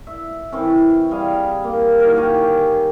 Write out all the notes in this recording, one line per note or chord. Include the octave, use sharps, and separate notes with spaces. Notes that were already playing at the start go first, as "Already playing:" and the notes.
E5
E3 C4 C#4
G3 G#4 F5
A#3
D#3 F#3 A#4
G4 C#5 F5 G#5